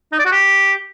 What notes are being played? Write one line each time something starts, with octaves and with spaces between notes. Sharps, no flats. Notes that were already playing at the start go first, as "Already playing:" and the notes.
D#4
D5
F#4
G4